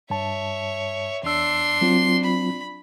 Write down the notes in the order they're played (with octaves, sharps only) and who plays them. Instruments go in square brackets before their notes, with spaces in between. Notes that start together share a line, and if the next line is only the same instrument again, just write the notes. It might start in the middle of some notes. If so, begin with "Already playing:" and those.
[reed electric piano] G2 A5 [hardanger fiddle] C#5 E5
[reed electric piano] E2 E6 [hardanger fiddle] D4 C6
[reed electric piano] F#3 C4 F4
[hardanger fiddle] B5